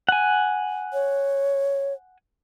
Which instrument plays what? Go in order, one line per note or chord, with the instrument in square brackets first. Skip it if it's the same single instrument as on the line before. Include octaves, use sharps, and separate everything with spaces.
[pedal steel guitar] F#5 G#5
[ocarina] C#5